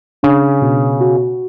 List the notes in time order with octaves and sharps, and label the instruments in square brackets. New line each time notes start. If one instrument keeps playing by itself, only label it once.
[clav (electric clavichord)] C#3 [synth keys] D4
[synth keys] B2
F#4